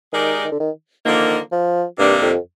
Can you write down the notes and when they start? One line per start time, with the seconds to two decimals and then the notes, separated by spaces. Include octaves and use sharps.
0.12 D#3 G#3 D#4 G4 A#4 D5
0.44 D#3
0.52 D3
0.60 D#3
1.05 D3 D#3 F3 A#3
1.52 F3
1.98 G2 C3 D#3 G3 A#3 D4
2.21 F2